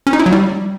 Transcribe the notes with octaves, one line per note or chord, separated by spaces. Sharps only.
C#4
D#4
E4
F#3
G3